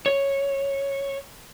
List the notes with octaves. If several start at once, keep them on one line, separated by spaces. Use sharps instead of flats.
C#5